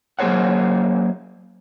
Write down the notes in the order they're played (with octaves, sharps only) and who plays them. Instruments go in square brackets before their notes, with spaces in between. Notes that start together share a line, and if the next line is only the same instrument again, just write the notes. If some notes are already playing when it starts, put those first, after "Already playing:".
[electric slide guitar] F#3 A#3 G#4 C5 C#5 F#5